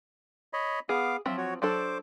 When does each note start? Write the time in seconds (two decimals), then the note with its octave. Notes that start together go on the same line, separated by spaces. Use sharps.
0.53 C#5 D#5 B5
0.89 B3 G#4 F5 D6
1.26 F3 F#3 C4 E5
1.38 F#4 C#5
1.62 F#3 D4 A4 C5 D6